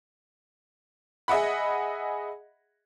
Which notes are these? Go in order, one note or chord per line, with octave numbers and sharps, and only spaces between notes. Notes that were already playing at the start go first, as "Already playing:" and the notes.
G#4 D#5 E5 F#5 B5